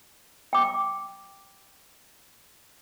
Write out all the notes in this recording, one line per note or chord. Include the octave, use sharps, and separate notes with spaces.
G5 D6